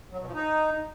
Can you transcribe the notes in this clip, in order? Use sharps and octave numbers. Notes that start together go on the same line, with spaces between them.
F#3
B2
F3
D#4